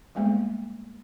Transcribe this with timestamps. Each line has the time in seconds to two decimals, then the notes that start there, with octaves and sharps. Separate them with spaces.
0.15 G3 G#3 A#3 B3